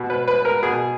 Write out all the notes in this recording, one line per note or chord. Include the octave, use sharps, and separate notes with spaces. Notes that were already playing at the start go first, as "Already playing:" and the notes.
Already playing: B2
B4
B4
A#4
B2 G#4